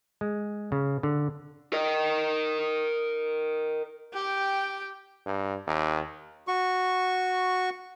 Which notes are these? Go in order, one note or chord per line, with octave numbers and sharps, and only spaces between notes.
G#3
C#3
D3
A#4 D#5
G4 G5
G2
D#2
F#4 C#6